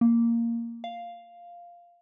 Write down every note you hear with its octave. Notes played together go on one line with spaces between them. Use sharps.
A#3
F5